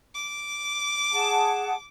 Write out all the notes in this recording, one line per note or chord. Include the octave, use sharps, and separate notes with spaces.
D6
G#4 F#5 A5